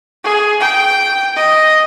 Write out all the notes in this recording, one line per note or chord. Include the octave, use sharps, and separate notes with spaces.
G#4
G5
D#5